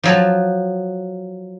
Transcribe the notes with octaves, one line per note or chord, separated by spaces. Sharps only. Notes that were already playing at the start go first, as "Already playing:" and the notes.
F3 F#3 A5